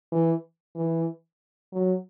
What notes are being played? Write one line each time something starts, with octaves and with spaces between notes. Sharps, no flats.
E3
E3
F#3